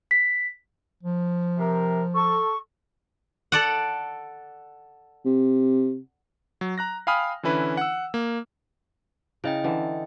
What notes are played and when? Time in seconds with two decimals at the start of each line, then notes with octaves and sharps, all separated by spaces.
0.11 B6
1.03 F3
1.58 C3 A#4
2.15 A4 C#6
3.52 A4 D5 F#5
5.25 C3
6.61 F#3
6.78 A#5 F#6 A#6
7.07 F5 G5 G#5 B5 D#6 F6
7.43 D3 E3 C#4 E4 B4
7.77 F#5 E6
8.14 A#3
9.44 C#3 E4 D#5 G5
9.64 D3 E3